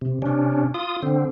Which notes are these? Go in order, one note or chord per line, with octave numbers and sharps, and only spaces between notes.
C3
C3 C#4 D4
F4 D#6
D3 C4